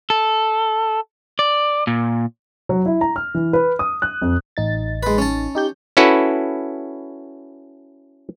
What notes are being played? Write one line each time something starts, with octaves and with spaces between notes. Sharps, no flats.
A4
D5
A#2
F#3
E4
A#5
F6
E3
B4
D#6
F#6
F2
A1 D#4 A6
G#3 B4
C#4 A5
D#4 G4 G6
C#4 E4 F#4 A4 B4